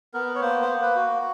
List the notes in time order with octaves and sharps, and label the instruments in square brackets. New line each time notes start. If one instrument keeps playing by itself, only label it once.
[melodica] B3 A#4
C#5
A#3 C5
C5
A#3
B4
F#4